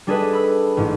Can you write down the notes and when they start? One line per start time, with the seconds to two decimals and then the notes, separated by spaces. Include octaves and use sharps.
0.07 G3 D4 G#4 A4 B4 D#5
0.33 B5 E6
0.77 A1 G#2